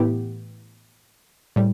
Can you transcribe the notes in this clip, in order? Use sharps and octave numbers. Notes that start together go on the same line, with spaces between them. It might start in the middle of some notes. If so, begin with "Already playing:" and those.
Already playing: A2 E3 B3 E4 G4
A2 G3